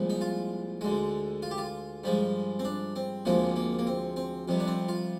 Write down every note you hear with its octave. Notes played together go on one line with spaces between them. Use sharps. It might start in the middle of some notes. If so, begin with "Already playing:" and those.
Already playing: C2 A#2 F3 G#3
D#4
F4
D2 D3 G#3
F4
G4
F4
G2 F3 G#3
C4
D4
C4
D2 C3 F3 G#3 A#3
A#3
A#3
C4
C4
F2 C3 G3
D4
C4
F4